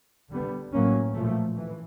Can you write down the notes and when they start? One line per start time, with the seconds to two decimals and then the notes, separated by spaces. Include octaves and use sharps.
0.30 D3 G3 B3
0.72 A2 F#3 A#3 C#4
1.14 A#2 F3 A3
1.57 E3